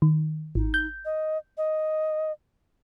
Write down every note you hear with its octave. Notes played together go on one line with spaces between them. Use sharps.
D#3
G#1 D#4
G6
D#5
D#5